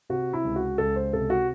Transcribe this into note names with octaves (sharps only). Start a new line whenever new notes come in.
C3 F#4
E4
C#2
F#4
C#2 A4
C5
C3 A4
F#4